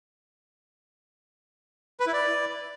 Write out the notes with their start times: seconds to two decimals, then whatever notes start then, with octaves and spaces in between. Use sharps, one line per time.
2.00 B4
2.07 E4
2.13 D5